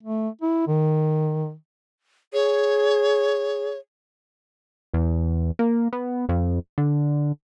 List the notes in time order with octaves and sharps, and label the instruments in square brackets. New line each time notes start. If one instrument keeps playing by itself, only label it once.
[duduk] A3
E4
D#3
[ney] G#4 [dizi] C#5
[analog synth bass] E2
A#3
B3
F2
D3